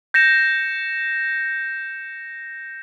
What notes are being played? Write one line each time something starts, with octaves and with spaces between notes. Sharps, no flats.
G6 A#6 C#7 E7